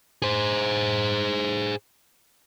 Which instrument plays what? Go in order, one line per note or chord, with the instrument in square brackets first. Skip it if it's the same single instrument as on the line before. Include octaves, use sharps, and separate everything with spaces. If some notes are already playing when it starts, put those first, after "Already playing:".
[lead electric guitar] G#4 C5